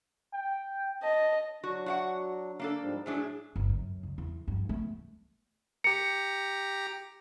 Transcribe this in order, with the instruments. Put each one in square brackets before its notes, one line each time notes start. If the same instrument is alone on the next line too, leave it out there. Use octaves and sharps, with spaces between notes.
[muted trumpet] G5
[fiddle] D#5 [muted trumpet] A5
[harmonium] F#3 D4 [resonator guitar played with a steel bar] F#4
[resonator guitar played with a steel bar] F#4 F5 F#5
A#3 D4 A4
[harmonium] G#2 F3 G3
[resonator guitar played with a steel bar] A2 F#3 D4 [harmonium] G#4
[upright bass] G1
F#2
C#2
E2
G2 F3
A3 B3
[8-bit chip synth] G4 A#5 [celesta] C#7